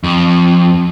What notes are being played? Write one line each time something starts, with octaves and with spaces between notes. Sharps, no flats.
F2